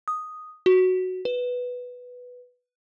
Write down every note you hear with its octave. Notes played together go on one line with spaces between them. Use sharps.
D#6
F#4
B4